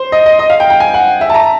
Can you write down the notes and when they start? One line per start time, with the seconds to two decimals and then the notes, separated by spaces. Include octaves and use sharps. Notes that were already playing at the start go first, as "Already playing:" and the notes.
Already playing: C5
0.12 D#5
0.26 D#5
0.39 D#5
0.50 F5
0.60 G5
0.70 G5
0.80 G#5
0.94 F#5
1.21 E5
1.30 A5
1.34 A#5